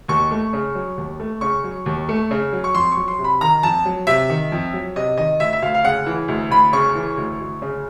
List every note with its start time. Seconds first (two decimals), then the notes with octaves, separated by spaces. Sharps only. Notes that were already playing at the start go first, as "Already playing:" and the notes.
0.08 D#2 C#6
0.31 A3
0.53 C#3
0.75 F#3
0.97 D#2
1.20 A3
1.41 C#3 C#6
1.64 F#3
1.86 D#2
2.09 A3
2.31 C#3
2.53 F#3
2.64 C#6
2.74 F2 C6
2.92 F#3 C#6
3.08 C6
3.19 C3
3.24 B5
3.41 D#3 A#5
3.63 F2 A5
3.85 F#3
4.07 C3 E5
4.30 D#3
4.52 F2
4.73 F#3
4.96 C3 D#5
5.17 D#3 D#5
5.40 D2 E5
5.53 E5
5.62 D2 F5
5.74 F5
5.85 C#3 F#5
6.06 E3
6.28 D2
6.50 D2 B5
6.73 C#3 C#6
6.95 E3
7.17 D2
7.40 D2
7.62 C#3